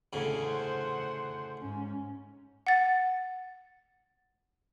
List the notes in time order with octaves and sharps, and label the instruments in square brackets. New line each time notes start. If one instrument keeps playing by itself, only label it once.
[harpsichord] D2 A2 C#3
[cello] C5 F#5
G#2 C#4
[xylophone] F#5 A6